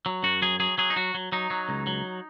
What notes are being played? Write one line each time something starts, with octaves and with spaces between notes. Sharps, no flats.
F#3
F#2 F#4
F#3 G#4
F#3 G#4
F#3 G#4
D#4
F#3 F#4
F#3
F#3 D#4
F#3
C#2
F#3